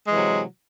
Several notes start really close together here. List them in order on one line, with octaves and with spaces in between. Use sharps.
G#3 E3 C3 F#3